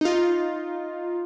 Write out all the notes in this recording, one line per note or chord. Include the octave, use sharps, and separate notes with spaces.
D#4 F4